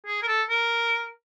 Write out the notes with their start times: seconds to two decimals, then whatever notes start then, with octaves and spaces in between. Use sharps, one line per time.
0.07 G#4
0.23 A#4
0.28 A4
0.49 A#4